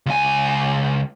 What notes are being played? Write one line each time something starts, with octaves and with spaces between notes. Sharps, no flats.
C#2 G#5